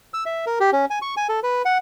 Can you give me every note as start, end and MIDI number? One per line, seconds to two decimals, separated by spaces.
0.14 0.24 88
0.26 0.45 76
0.46 0.59 70
0.60 0.70 67
0.73 0.85 61
0.90 0.99 80
1.02 1.15 85
1.17 1.27 80
1.29 1.40 69
1.43 1.62 71
1.65 1.78 78